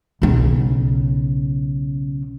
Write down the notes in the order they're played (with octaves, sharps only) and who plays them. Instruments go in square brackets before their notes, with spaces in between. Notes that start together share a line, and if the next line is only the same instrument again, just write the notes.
[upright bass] B1 C#3